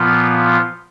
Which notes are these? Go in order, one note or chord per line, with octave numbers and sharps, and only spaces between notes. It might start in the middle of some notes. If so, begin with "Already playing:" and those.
Already playing: A#2 F3 B3 F4